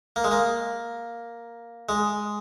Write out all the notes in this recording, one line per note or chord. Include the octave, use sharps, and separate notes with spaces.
A#3
G#3
A#3
G#3